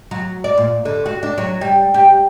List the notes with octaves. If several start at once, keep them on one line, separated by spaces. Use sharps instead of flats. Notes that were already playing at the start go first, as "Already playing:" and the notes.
F#3
D5
A#2
D3
F#4
D4
F#3
G3
G4